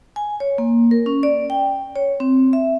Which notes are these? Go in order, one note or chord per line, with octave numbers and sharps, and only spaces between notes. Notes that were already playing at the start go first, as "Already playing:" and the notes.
G#5
C#5
A#3
A#4
C#4
D5
G5
C#5
C4
E5